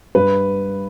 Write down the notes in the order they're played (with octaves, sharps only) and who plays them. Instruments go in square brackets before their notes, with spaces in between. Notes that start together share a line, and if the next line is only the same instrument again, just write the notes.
[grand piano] G2 B4